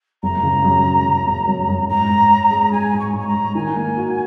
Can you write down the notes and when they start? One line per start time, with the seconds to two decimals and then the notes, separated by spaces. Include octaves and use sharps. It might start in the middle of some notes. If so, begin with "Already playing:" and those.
0.23 F#1 A#5
0.43 C#3
0.65 F#2
0.85 F#2
1.06 C#3
1.27 F#1
1.47 F#2
1.69 F#2
1.89 G#2 A#5
2.09 G#2
2.31 G#2
2.51 G#3
2.72 G#3 G#5
2.93 G#2
2.99 C#6
3.13 G#2
3.19 C#6
3.27 A#5
3.34 G#2
3.55 D#3 G#5
3.76 A#3
3.97 F#4